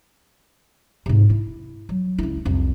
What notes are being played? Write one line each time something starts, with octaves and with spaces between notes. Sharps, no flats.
G#2 C3
E4
F#3
C#2 E4
C2 F2